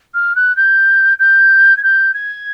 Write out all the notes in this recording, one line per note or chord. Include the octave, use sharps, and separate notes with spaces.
F6
F#6
G6
G6
G#6
G6
G#6